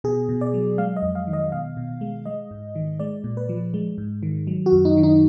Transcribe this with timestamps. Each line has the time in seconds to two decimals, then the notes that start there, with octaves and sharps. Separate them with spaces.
0.04 B2 G#4
0.29 B2
0.41 D5
0.54 F#3
0.78 G#3 F5
0.96 D#5
1.02 F2
1.15 F5
1.27 D#3
1.33 D#5
1.52 B2 F5
1.77 B2
2.01 G#3
2.25 G#3 D#5
2.51 G#2
2.75 D#3
2.99 G#3 D5
3.24 A#2
3.37 B4
3.49 F3
3.74 G#3
3.98 G#2
4.23 D#3
4.47 F#3
4.66 F#4
4.72 F#2
4.85 D#4
4.97 D#3
5.03 D#4